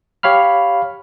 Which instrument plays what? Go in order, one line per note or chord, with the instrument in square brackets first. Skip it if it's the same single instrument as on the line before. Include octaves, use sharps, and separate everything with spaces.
[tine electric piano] G4 C#5 F5 B5 F6